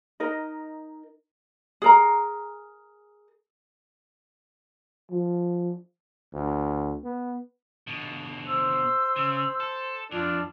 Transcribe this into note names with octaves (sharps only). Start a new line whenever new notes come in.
D#4 A#4 D#5
G#4 A#4 A#5
F3
D2
B3
B2 D3
C5 E6
C#3
A4
F2 D4 F4